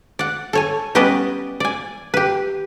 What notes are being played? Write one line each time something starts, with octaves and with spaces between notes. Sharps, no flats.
D5 F#5
A4 C#5 G#5
G3 B3 C#4 B4 D5 D#5
D5 G#5
G4 B4